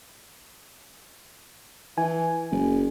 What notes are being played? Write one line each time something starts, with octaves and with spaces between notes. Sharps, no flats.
E3 G#5
F#1